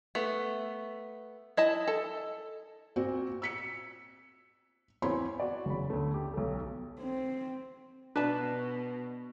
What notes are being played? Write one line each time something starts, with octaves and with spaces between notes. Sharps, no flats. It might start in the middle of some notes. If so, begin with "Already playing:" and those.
A3 B3
E4 D#5 A5
A4
A#2 C4 F#4
E6 B6 C#7
E2 C4 C#5 B5 C6
F#4 D5
F#1 E2 B5
D2 A3
G4
B1 A4
C4
B2 D4 B4 A5